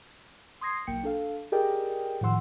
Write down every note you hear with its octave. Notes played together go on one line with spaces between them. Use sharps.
C6 D#6 G#6 A#6 C7
B1 A#3 G5 C#7
D4 A4 F5
G4 G#4 A#4 D5 D#5 G5
A2 D#3 F3 F#5 C6 E6